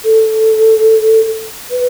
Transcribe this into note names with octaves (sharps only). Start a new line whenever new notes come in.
A4
B4